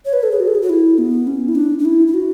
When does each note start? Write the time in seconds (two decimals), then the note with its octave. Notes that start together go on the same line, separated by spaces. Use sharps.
0.05 C#5
0.13 B4
0.23 A4
0.31 G#4
0.40 F#4
0.48 A4
0.55 G#4
0.62 F#4
0.70 E4
0.98 B3
1.27 C#4
1.48 E4
1.55 D4
1.79 D4
1.85 E4
2.07 E4
2.14 F#4